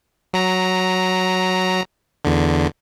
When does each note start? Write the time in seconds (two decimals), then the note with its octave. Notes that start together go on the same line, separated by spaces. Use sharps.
0.34 F#3 A#5
2.25 E2 D3